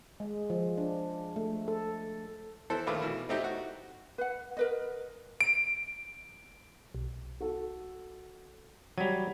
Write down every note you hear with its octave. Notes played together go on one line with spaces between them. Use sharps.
G#3
F3
D4
A3
A4
E3 A4 C5
A#1 D#3 A3 F4 B4 D6
B2 E3
A3 C4 D#4 E4 G4
F#4
B4 F#5
A#4 B4 D#5
D7
B1
F#4 A4
F#3 G3 G#6 B6 D#7 F7